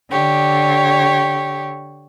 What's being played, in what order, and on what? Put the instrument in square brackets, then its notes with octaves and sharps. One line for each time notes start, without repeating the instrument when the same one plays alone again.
[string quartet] D3 G4 C#5